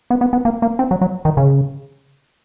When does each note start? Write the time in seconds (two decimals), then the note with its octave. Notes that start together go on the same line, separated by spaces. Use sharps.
0.10 B3
0.21 B3
0.33 B3
0.45 A#3
0.62 A#3
0.79 C4
0.91 F#3
1.01 F#3
1.25 D#3
1.37 C#3